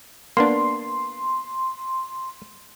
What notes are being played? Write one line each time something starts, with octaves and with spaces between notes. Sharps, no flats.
A#3 B3 D4 C6